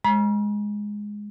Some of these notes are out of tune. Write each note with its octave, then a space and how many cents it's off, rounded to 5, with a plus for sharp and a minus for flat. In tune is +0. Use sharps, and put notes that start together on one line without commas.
G#3 +0 A#5 +45